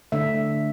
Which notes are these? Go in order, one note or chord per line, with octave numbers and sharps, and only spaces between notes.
D3 A3 D4 E5